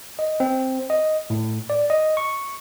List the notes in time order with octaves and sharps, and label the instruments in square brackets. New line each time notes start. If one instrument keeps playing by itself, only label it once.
[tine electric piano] D#5
C4
D#5
A2
D5
D#5
C#6